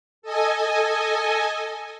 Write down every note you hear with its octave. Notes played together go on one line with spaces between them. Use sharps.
A4 D#5 G#5